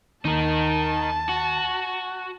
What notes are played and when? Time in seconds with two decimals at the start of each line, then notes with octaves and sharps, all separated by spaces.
0.25 D#2 D#4 A#4 A5
1.29 F#4